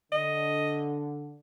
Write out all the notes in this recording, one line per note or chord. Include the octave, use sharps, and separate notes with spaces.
D3 D#5